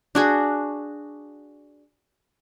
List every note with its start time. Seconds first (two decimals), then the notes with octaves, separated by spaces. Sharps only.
0.15 D4 F#4 G#4